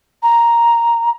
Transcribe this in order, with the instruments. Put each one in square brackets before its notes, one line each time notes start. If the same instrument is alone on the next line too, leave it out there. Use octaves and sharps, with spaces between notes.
[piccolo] A#5